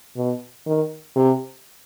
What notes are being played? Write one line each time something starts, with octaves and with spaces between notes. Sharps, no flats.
B2
D#3
C3